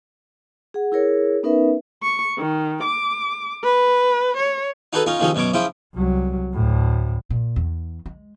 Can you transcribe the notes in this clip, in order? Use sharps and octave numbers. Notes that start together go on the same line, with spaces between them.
G#4 F#5
E4 G#4 A#4 C#5
B3 C#4 D#4 A#4 B4 E5
C#6
D#3
D6
B4
C#5
D#4 F#4 G#4 A4 B4
C#4 D#4 F4
D#2 C#3 F3 C#4 D#4
F#2 B2 C#5 D6
C#3 F3 E4 C5 G5
C2 F#3
D2 A2
A#2
E2
G#3